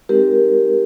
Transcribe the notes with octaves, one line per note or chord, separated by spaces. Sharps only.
G#3 C4 D#4 G4 A#4